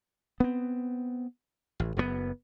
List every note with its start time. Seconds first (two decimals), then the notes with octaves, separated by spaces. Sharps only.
0.40 B3 C4
1.80 A1
1.97 F#1 F#2 A#2 B3